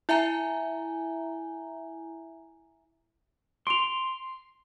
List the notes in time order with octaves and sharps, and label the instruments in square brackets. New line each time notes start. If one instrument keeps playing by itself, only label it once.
[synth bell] E4 E5 G#5 A#5
[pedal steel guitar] C6 [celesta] D7 F7